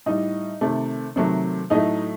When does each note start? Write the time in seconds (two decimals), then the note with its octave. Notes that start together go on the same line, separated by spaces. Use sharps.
0.06 A2 G3 D#4 D#5
0.61 C3 D#3 A3
1.16 C3 D#3 F#3 A3
1.70 A2 F#3 A3 D#4 D#5